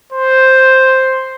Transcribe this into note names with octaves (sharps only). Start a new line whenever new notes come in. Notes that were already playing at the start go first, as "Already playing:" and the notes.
C5